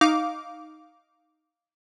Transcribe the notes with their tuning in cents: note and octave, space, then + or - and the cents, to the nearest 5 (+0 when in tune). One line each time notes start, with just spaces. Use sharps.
D#4 +0 F5 +0 D6 -15